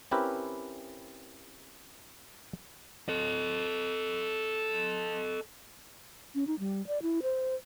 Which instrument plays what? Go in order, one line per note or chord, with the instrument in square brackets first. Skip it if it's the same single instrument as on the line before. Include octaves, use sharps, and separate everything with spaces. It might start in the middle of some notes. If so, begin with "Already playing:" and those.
[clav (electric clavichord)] C4 C#4 E4 G4 A#4 B4
[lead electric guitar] A4 D#5
[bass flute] C#4
D#4
G3
D5
E4
C5